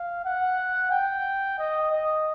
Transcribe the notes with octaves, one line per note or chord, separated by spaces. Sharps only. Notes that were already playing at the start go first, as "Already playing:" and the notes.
Already playing: F5
F#5
G5
D#5
D#5